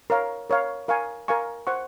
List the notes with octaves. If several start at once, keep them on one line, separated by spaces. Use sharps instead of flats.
A#4 C#5 F5
A#4 C#5 F5
A#4 F5 G#5 C#6
A#4 F5 G#5 C#6
C5 F#5 C#6